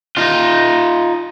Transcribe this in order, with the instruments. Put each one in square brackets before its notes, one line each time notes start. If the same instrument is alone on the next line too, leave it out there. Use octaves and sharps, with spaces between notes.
[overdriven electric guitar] D#4 F4